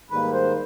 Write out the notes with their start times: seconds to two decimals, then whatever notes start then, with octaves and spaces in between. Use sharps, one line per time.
0.10 G#2 D#3 G3 A#3 B4
0.33 C5